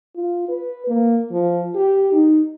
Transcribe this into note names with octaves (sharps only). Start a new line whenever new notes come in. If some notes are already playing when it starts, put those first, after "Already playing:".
F4
B4
A#3
F3
G4
D#4